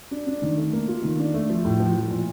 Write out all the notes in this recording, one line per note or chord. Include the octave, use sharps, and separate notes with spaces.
D4
D4
D#3
A3
A#3
F4
D#3
D4
A3
F3
A2
F3
F3
A#2